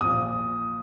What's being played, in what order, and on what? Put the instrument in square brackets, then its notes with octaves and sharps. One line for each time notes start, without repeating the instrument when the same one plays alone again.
[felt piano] A#1 A#2 F3 [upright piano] D#6